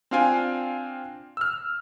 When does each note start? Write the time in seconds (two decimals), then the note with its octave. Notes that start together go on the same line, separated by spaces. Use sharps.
0.11 C4 D4 F4 F5 G5 G#5
1.37 E6 F6